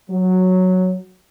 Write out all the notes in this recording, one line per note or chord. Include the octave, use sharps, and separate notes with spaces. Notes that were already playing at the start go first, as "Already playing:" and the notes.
F#3